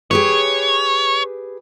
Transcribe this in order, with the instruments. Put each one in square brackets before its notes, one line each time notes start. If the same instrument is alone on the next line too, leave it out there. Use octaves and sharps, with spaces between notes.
[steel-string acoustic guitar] G4 G#4 B4 [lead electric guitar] C#5